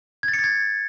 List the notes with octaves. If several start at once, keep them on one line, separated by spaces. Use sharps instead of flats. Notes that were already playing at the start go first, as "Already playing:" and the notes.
G#6
A6
C#7
A6
G#6